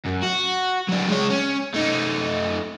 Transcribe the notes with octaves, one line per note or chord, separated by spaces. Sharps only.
F#2
F#4
F#3 D4
G#3 C#5
C#4
A3 D#4